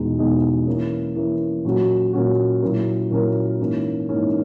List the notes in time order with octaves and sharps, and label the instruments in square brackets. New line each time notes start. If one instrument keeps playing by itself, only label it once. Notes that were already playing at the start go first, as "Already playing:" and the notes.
Already playing: [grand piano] E2 B2 G#3 D#4 G#4
E2 B2 G#3 D#4 G#4
E3 A#3 C#4
E3 A#3 C#4
A#2 F#3 C#4 F#4
A#2 F#3 C#4 F#4
A#2 F#3 C#4 E4 A#4
A#2 F#3 C#4 E4 A#4
G#2 E3 A#3 C#4
G#2 E3 A#3 C#4